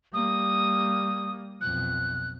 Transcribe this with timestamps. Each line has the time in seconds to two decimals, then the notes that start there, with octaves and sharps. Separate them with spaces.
0.14 G3 A#3 D#6
1.61 B1 F2 F#6